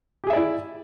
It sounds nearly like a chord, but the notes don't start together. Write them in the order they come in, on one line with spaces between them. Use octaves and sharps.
G4 G#4 E5 D5 E4